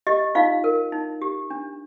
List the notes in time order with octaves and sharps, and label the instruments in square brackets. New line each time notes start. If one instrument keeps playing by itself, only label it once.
[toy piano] G4 D#5
D#4 F4 F5
A#4
D#4
G4
D4